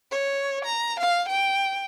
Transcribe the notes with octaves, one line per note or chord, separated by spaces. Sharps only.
C#5
A#5
F5
G5